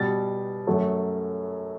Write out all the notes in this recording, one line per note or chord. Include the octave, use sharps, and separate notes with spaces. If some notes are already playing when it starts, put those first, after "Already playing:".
Already playing: B2 G3 A6
F#2 F#3 A3